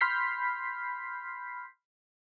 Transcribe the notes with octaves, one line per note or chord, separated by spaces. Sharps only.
B5 C6 F6 G6 B6 C7